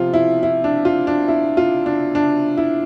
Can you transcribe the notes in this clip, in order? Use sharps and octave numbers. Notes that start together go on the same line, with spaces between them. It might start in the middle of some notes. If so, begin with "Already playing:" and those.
Already playing: C3 F3 F4
E4
E4
D4
F4
D4
E4
F4
D4
D4
E4